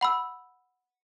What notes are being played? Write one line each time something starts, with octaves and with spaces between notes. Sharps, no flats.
F#5 B5 E6